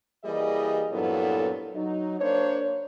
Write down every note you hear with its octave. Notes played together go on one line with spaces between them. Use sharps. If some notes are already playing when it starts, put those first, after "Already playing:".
E3 G3 A#3 G#4 D#5
G2 A#2 F#3 B3 E4 A4
F#3 D#4
A#3 D4 C5 C#5